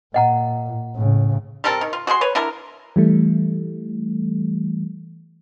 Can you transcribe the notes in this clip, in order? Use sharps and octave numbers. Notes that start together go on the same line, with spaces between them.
A#2 D#5 F#5 A#5
A2 C#3
G3 C4 A4 A#4
D#3
F4
F#4 G#4 F#5 C6
B4 C#5
D3 E4 A4 A#4
E3 G3 A3